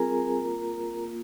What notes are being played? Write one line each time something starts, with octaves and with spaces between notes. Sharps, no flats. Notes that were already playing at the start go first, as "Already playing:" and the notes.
Already playing: G3 C4 F4 G#4 A#4 G#5 A#5
A#3 F4
A#3 F4